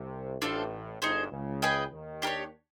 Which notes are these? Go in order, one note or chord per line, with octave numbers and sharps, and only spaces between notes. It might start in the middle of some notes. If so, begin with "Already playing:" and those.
Already playing: C2 C3
A1 A2 D4 F4 A4 C5
G1 G2 D#4 G#4 C5
C#2 C#3
G#4 B4 D#5 G5
D#2 D#3
D4 G4 A#4 C#5